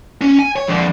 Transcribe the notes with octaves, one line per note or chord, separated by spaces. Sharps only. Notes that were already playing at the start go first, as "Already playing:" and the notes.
C#4
G#5
C#5
F2 D3